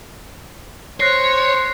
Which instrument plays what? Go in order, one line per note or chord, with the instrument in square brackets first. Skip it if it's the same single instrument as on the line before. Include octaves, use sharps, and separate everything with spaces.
[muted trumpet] C5 [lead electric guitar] C#5 [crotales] F#6 A#6 C7